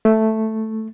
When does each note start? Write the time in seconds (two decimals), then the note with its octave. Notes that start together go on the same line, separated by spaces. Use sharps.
0.05 A3